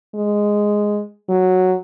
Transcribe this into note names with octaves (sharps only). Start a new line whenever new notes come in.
G#3
F#3